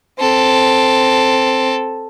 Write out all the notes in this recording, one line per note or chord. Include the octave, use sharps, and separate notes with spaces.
C4 A4